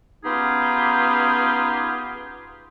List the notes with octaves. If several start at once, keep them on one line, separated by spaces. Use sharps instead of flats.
B3 C#4 D#4 F4 G4 G#4